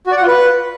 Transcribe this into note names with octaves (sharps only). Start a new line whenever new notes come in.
F#4
D5
F#5
F4
B4